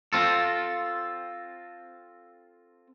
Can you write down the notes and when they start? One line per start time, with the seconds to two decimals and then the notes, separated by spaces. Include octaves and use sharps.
0.13 C4 F4 A4